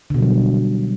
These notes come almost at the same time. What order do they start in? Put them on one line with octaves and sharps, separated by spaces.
D3 B2 G3 F#3